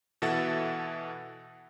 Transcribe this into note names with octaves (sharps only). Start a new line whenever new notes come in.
B2 E3 A4 E5 F#5 A6